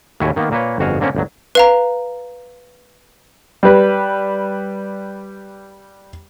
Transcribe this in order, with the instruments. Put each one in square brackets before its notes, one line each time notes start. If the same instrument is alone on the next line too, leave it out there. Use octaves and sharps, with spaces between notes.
[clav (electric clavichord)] D#2 A2 E4 F#4 C#5 G#5
D#3 A#3 B3
A#2 A#3 B4 C#5
G1 F2 F#4 F5 G#5
D3 A#3 C4 C#4
G1 D2 F#3
[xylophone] B4 F5 A#5
[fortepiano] G3 B4